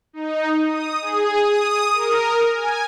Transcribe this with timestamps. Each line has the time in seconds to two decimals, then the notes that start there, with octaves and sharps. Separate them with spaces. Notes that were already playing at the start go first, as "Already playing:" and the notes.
0.13 D#4
0.67 D#6
1.01 G#4
1.42 D#6
1.93 A#4
2.52 G#5